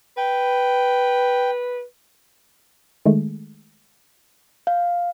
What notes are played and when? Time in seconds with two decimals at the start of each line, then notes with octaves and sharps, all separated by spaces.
0.17 B4 G5
3.05 D#3 G#3 A3
4.67 F5 G6